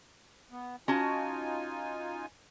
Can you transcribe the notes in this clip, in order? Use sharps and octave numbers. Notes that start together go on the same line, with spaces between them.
B3
C#4 D#4 F4 F#4 G#5 A5